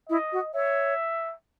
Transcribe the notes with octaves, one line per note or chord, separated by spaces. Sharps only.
E4 D#5
F#4
C#5 E5